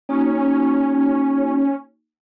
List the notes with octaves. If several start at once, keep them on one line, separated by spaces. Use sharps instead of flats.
A#3 C#4 D#4 F#4